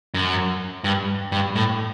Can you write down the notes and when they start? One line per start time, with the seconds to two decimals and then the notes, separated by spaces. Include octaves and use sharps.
0.14 F#2
0.84 G2
1.32 G2
1.56 A2